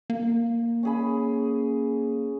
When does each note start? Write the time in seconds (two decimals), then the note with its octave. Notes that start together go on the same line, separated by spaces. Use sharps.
0.10 A#3
0.83 C#4 G#4 B5